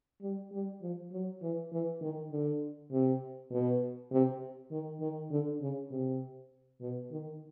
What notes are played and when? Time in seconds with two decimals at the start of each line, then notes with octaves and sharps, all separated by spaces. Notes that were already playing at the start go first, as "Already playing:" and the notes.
0.21 G3
0.52 G3
0.82 F3
1.12 F#3
1.42 E3
1.72 E3
2.01 D#3
2.32 D3
2.92 C3
3.51 B2
4.11 C3
4.71 D#3
5.01 D#3
5.31 D3
5.61 C#3
5.91 C3
6.81 B2
7.11 D#3